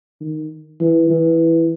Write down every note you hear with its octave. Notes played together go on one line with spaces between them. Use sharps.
D#3
E3
E3